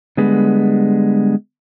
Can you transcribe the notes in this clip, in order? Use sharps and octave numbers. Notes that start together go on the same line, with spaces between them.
D3 G3 G#3 B3